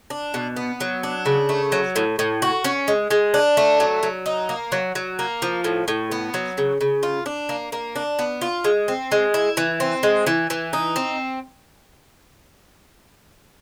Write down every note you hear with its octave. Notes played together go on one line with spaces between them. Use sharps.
D4
B2
B3
F#3
D4
C#3
A3
F#3
A2
A2
F#4
C#4
G#3
G#3
D4
A3
F#3
F#3
D#4
A#3
F#3
F#3
A#3
F3
A2
A2
B3
F#3
C#3
C#3
F4
D4
A#3
A#3
D4
B3
F4
G#3
C4
G#3
E4
E3
C4
G#3
E3
E3
D#4
C4